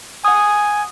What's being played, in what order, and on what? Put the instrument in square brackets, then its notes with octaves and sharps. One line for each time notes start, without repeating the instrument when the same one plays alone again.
[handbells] F#5 D#6 [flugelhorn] G#5